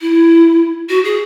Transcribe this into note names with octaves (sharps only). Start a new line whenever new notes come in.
E4
F#4
G#4